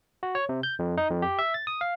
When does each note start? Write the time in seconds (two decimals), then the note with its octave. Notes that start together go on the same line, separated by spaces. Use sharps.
0.23 F#4
0.35 C#5
0.49 C3
0.63 G6
0.79 F2
0.97 D#4
1.10 F2
1.22 G4
1.39 E5
1.54 A6
1.67 D#6
1.81 F5